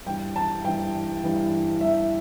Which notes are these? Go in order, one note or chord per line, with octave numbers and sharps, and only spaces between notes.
G2 E3 G5
A5
G2 E3 G5
G2 E3
G2 E3 E5